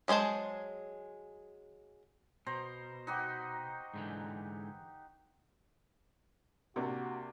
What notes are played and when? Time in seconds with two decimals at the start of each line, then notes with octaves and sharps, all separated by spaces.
0.08 F#3 G#3 G#4 C5 A5
2.46 B2 C5 A#5
3.07 D#4 F#4 G4
3.94 G#2 D3 E3
6.76 C3 A#3 D4 F#4